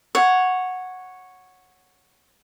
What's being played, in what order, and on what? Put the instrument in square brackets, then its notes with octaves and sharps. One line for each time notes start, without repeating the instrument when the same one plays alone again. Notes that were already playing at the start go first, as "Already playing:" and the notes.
[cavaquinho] C#5 F#5